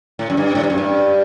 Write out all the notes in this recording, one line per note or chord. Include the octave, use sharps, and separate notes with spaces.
A2
F#2
G2
A2
G2
F#2
G2